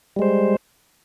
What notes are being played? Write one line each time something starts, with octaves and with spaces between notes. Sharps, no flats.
G3 G#3 C5